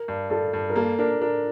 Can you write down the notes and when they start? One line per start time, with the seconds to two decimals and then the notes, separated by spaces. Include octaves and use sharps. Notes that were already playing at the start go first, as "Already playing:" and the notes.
Already playing: A#4
0.08 G2
0.30 G2 A4
0.53 G2
0.70 A#4
0.76 A#3 A4
0.99 D4 A#4
1.21 D4 A#4